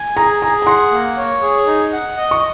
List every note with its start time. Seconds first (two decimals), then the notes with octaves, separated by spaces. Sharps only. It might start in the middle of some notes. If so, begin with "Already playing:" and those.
Already playing: G#5
0.16 G#4 A#5
0.42 G#4 A#5
0.62 A#5
0.66 F#5 C6
0.91 A#3
1.17 C#5
1.42 G#4
1.67 D#4
1.93 F#5
2.17 D#5
2.31 C#6